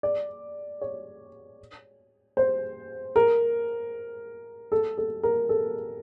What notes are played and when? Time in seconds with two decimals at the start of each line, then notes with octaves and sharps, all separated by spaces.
0.03 D5
0.82 C#5
2.37 C5
3.16 A#4
4.72 A4
4.98 A4
5.23 A#4
5.49 A4